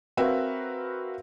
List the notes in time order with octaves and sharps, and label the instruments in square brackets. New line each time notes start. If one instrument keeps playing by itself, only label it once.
[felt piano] C4 F#4 A#4 B4 E5 F5